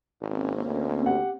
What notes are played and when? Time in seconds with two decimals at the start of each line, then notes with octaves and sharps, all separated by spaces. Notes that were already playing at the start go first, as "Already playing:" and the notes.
0.21 G#1 A#3 C4 C#4
0.66 D2
1.06 G4 F#5